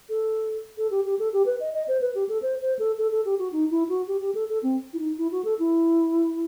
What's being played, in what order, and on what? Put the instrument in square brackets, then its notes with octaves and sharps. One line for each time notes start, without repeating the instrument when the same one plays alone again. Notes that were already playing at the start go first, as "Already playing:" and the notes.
[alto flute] A4
A4
G4
G4
A4
G4
B4
D#5
D#5
C5
B4
G4
A4
C5
C5
A4
A4
A4
G4
F#4
D#4
E4
F#4
G4
G4
A4
A4
C4
E4
D#4
E4
F#4
A4
E4